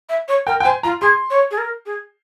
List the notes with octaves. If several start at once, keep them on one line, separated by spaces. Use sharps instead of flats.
E5
C#5
A#4 G5
G5
C5 G#5
F4 A#5
G#4 C6
C#5
G#4
A#4
G#4